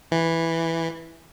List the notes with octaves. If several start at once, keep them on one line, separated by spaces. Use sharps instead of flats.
E3